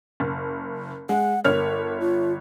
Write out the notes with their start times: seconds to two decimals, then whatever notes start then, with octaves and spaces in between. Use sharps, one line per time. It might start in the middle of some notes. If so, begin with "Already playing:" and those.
0.20 F#1
1.09 G#3 F#5
1.44 G1 A#4 C#5 F6
2.00 F4